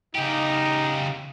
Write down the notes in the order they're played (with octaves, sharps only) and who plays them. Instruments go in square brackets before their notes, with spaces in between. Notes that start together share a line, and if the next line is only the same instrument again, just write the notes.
[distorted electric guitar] C#3 G4 [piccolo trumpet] D#4